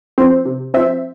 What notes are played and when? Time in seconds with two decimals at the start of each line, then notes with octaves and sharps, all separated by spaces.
0.18 F3 C4 C5
0.45 C3
0.74 F3 C4 E5